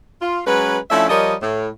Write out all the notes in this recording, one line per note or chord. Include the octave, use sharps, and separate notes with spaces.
F4
F#3 G#3 C#4 B4
F3 A3 C#4 D4 E4 E5
F3 G3 A#4 C#5 D#5
A2